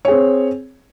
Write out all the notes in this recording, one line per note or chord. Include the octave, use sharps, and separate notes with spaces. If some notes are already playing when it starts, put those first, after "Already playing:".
C4 G#4 C#5